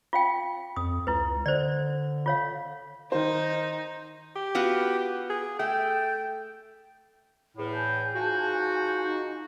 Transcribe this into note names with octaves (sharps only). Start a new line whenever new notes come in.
F4 F5 G5
F2 D#6
C#2 E4 B4
D3 C5 D5
F4 C#5 F5
D#3 D#4 C5
G4
B3 F4 F#4
G#4
A3 G5
E2 A2
G#5 A5 G6
G#2 F4 F#4
D#4